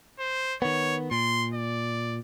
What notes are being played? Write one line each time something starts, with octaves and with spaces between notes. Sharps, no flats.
C5
D#3 B3 C#5
A#2 C6
D5